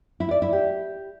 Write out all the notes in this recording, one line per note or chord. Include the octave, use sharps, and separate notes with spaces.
E4
D5
E4
G4